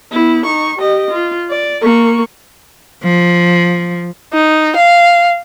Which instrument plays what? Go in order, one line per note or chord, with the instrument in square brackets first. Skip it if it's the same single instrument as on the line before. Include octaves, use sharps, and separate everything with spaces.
[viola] B3 E4
D#4 C#6
G4 D#5
F4
D5
A#3 C#6
[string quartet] F3
[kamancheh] D#4
F5